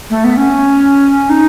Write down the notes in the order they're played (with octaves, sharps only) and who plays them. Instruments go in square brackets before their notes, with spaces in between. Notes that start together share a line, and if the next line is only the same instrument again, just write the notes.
[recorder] A3
B3
C#4
D#4